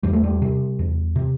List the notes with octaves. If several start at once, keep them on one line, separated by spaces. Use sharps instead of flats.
E2 G3
A3
G3
C3
E2
C3